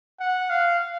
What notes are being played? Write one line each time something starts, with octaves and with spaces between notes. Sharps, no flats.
F#5
F5